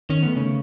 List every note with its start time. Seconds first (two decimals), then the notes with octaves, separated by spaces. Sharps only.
0.10 D#3 C#4
0.23 A3 B3
0.36 C#3 C#4